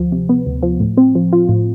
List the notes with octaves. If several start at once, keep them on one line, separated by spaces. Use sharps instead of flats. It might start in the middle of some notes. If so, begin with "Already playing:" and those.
Already playing: D2 F3
C3
B3
D2
F3
A2
C4
F3
F4
A2